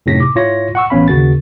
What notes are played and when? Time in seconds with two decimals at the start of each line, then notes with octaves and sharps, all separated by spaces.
0.06 F#2 A2 C3 D#4 A#6 B6
0.20 D6
0.35 G#2 E4 F4 C#5 A#6
0.75 F#5 C#6 E6
0.90 A1 B3 C#4 F5 B5
1.08 D#2 C#3 F#4 A#4 A6